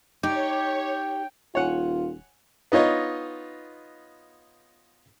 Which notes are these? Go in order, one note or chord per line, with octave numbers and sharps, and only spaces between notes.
D#4 G4 C#5 G5
D#1 F4 C#5 F#5 G#5
B3 D#4 F4 C#5 D#5